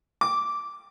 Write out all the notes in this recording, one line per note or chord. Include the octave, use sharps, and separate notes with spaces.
D6